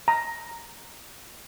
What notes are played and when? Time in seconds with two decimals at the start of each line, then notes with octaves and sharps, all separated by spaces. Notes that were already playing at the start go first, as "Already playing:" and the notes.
0.08 A#5